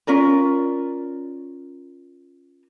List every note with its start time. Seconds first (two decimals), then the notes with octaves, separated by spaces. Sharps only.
0.07 C#4 F4 A#4 D5